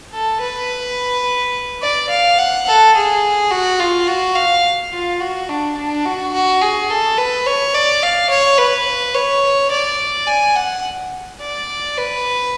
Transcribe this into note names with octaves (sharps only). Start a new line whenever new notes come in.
A4
B4
D5
F5
F#5
A4
G#4
F#4
F4
F#4
F5
F4
F#4
D4
D4
F#4
F#4
G#4
A4
B4
C#5
D5
F5
C#5
B4
C#5
D5
G#5
F#5
D5
B4